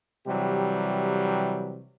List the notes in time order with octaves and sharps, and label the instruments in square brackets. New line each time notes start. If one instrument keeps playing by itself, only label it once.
[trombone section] C3 E3 F#3 G3 G4